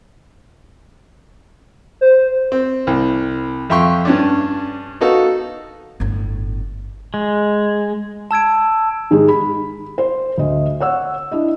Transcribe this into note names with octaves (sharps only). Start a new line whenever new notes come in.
C5
C4
C2
F2 E5 F5 G5 C6 C#6
G2 C#4 D4
B3 D#4 F#4 A4 F5
G1 A2
G#3
A5 E6 G#6 D7
G#2 D#3 G#3 D#4 G4 G#4
B5
C5
D2 D#5
C#5 F#5 E6
D4 E4 D#5